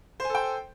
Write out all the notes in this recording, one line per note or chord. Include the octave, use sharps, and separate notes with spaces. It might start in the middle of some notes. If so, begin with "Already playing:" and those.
A4 C5 G5 G#5